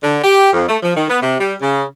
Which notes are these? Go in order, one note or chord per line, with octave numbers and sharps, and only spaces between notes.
D3
G4
F2
A3
F3
D#3
B3
C3
G3
C#3